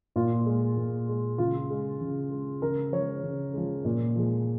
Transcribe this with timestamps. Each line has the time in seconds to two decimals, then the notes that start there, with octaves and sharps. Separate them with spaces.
0.16 A#2 F4
0.46 G#3
0.77 A#2
1.09 G#3
1.38 C#3 F4
1.70 G#3
2.01 C#3
2.30 G#3
2.62 C#3 A#4
2.92 F3 G#3 C#5
3.23 C#3
3.53 F3 G#3
3.85 A#2
4.16 F3 G#3